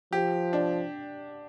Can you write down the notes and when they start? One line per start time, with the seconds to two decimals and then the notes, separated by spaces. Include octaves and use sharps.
0.13 F3 G4
0.53 D4